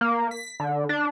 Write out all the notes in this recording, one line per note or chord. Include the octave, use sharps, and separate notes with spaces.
A#3
B6
D3
D4